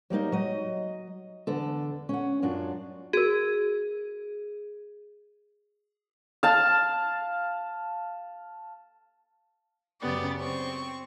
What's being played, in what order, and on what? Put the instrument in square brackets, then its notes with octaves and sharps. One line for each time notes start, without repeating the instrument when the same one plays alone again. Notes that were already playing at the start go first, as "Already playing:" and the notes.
[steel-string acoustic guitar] F#3 G3 A#3 D#4
F#3 D#5
E2 D3 A4
C#4 F#5
F#2 F#3 D4 F4
[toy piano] F#4 A#4 [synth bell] G#4
[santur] F5 A5
[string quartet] F#2 C#3 B3 G4 D5
C4 C#6